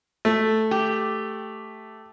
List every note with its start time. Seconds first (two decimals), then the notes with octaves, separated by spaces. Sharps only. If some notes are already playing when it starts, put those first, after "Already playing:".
0.25 A3
0.71 G4